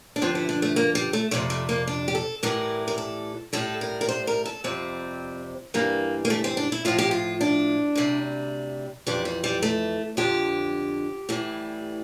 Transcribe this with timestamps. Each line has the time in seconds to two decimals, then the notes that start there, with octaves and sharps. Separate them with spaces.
0.16 D4
0.21 G2 D3 F3 C4
0.35 E4
0.49 D4
0.62 A3
0.76 A#3
0.95 G3
1.13 A3
1.31 F2 C3 G3 A3
1.50 A3
1.69 A#3
1.87 D4
2.08 G4
2.15 A4
2.43 A2 E3 G3 A#4
2.88 A#4
2.98 A4
3.53 A2 G3 A4
3.81 A#4
4.01 A#4
4.09 C5
4.27 A#4
4.46 A4
4.64 F2 C3 G3 C4
5.74 G2 E3 G3 A#3
6.25 A#3
6.30 A3
6.44 C4
6.57 D4
6.72 E4
6.85 A2 F3 F4
6.98 G4
7.11 F4
7.41 D4
7.95 D2 C3 G3
9.07 F2 E3 G3 D4
9.25 G3
9.44 G3
9.62 A3
10.17 F2 D3 F3 G4
11.29 A2 E3 G3